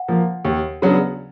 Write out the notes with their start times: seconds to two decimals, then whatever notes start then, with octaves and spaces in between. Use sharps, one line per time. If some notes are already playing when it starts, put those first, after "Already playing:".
Already playing: F#5
0.08 F3 A#3
0.45 D#2
0.82 C#3 F#3 B3 D4